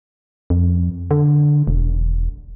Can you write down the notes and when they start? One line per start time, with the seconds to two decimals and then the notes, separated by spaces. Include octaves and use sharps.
0.50 F2
1.11 D3
1.67 E1